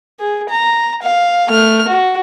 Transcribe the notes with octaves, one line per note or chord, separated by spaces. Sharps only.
G#4
A#5
F5
A3 F6
F#4